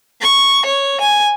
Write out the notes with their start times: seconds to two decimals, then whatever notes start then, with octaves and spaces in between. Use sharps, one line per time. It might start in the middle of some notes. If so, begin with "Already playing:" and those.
0.22 C#6
0.66 C#5
1.00 G#5